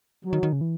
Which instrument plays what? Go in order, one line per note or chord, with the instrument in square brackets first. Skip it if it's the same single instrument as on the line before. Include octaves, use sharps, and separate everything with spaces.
[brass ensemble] F#3
[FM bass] D#3
D#3
C#3
E3